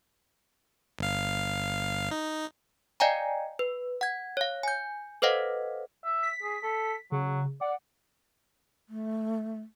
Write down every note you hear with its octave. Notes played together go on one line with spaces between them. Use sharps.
G1 F5
D#4
D5 D#5 F5 G5 G#5 A#5
B4
F#5 G#6
C#5 F5
G#5 G6
A4 B4 C5 D#5 F5 F#5
E5
B6
G#4
A4
C#3 F#3
D5 F#5
A3